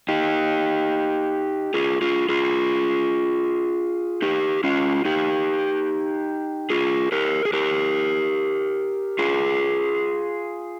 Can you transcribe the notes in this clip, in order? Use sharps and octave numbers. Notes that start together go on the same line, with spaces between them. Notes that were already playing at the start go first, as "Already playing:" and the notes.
D#4 G4
F4 G#4
F4 G#4
F4 G#4
D#4 G4
C#4 F4
D#4 G4
F4 G#4
G4 A#4
G#4
G4 A#4
F4 G#4